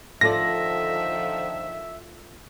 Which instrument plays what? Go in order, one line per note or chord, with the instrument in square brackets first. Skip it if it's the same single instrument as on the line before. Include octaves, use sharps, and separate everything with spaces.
[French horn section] D3 D#3 F3 [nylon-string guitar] F4 A4 D5 [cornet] E5 [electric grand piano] A#6